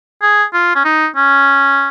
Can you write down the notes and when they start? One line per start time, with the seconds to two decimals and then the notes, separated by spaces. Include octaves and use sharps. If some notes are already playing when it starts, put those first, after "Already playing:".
0.22 G#4
0.53 F4
0.75 C#4
0.85 D#4
1.17 C#4